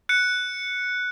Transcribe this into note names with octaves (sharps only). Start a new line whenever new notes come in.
F#6 C#7